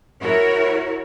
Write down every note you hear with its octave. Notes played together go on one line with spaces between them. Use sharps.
E4 F#4 A#4 C#5